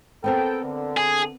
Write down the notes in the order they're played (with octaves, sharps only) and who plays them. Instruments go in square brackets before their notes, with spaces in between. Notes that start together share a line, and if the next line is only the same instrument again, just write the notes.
[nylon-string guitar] B3 C4 A#4 [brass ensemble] A4 G5
[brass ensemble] D3
[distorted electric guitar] G#4